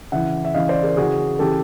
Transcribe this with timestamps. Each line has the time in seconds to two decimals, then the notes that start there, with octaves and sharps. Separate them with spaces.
0.12 C#3 E3 E5 F#5
0.45 E5
0.54 C#3 E3 D#5 F5
0.69 C5 D5
0.83 G#4 A#4
0.97 C#3 E3 F#4 G#4
1.39 C#3 E3 G4 A4